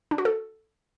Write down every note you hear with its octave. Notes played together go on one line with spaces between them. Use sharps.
D4
F#4
A4